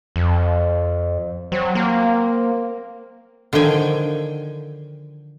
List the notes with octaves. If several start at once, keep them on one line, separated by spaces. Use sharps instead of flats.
F2
F#3 C4
A#3
D3 D#3 F3 G5 G#5